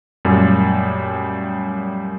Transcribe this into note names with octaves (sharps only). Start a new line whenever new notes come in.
F#2 A#2 G3 A3